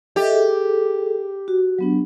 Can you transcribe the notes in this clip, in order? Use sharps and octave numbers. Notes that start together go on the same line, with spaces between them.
G4 A4 D#5 E5
G#4 A4
F#4
F#3 B3 D4